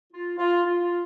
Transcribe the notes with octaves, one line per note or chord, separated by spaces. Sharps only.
F4
F4
F4